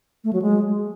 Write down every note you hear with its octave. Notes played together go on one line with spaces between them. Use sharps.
A3
F#3
G#3